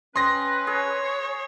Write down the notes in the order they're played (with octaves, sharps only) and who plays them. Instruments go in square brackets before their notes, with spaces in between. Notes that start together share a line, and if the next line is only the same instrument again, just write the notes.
[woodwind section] C#4 B4 [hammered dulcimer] D#5 G5 A#5 [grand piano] C6 A#6
[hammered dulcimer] G#4 [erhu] C#5